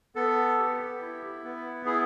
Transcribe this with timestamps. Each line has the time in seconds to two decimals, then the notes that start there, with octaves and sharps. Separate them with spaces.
0.16 B3 A4
0.58 G4
1.01 E4
1.44 B3
1.86 E4 G#4